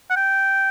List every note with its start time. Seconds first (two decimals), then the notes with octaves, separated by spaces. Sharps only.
0.10 F#5
0.16 G5